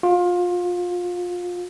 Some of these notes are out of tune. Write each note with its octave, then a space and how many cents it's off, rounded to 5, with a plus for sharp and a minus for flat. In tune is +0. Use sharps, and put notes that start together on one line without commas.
F4 +25